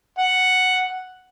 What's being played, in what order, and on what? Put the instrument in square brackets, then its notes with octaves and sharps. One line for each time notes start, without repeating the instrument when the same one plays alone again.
[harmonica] F#5